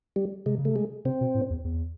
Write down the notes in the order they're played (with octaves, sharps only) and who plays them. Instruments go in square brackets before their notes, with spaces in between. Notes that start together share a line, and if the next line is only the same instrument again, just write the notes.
[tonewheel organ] G3
[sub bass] C3 [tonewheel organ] G#3
[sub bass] C#3
[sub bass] C3 [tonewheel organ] A3
[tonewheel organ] G#3
[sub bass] C3 [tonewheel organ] C4
[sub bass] B2
A2
E2
E2